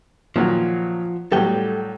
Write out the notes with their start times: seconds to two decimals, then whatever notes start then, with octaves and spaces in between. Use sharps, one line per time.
0.36 A#2 D#3 F3 F#3
1.32 A2 F#3 G3 A4 G5